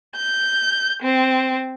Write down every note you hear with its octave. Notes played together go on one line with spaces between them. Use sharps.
G6
C4